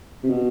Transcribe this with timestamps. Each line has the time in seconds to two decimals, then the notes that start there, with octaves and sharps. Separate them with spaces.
0.24 C3
0.30 B2